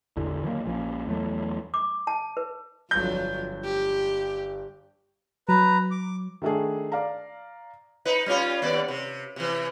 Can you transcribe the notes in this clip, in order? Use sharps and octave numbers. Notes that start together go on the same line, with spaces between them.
A1 E2 D3
D#3 F#3 A3 A#3
A#1 F3 A#3 C#4
E2 F#3 A3
D6
A5
B4
G1 F2 F#3 D4 G6
G4
F#3 B4 A#5
D6
D#3 A3 D4 G#4
D5 F5 A#5
D#4 B4
G3 C#4 F4
D#2 B3 D5
C3
C3 E3